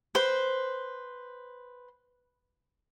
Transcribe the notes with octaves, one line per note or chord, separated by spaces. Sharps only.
B4 C5